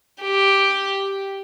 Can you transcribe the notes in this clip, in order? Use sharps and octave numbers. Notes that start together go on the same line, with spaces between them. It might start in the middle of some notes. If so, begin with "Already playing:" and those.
G4